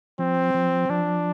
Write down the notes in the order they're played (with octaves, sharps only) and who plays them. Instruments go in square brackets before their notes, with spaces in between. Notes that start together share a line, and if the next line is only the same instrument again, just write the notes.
[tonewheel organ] F3 [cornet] C4
[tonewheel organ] F3
[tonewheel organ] F3 [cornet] D4